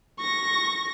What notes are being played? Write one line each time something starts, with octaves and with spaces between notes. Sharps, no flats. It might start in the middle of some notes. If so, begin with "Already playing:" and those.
C#6 A#6